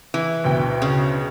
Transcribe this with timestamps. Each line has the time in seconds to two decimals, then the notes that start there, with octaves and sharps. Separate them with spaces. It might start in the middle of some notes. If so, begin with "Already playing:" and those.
0.14 E3
0.44 D2 B2 G5
0.82 C#3